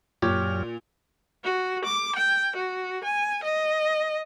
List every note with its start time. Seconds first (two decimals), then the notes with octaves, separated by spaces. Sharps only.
0.22 F#2 A#2 F#3 G4 C#5 F6
1.44 F#4
1.85 D6
2.16 G5
2.56 F#4
3.04 G#5
3.44 D#5